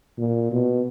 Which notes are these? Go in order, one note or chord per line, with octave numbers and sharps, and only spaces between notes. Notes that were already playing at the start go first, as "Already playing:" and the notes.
A#2
B2